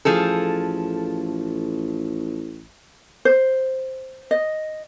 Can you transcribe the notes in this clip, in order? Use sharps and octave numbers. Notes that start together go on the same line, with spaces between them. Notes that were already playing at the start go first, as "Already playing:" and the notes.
A1 F3 G#4 A4
C5
D#5